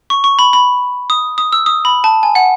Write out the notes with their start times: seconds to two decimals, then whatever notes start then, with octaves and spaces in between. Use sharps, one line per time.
0.10 C#6
0.24 C#6
0.39 B5
0.53 B5
1.10 D#6
1.38 D#6
1.52 E6
1.66 D#6
1.85 B5
2.04 A5
2.23 G#5
2.35 F#5